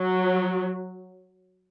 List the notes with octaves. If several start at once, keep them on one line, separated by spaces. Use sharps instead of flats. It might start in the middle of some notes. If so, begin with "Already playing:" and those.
Already playing: F#3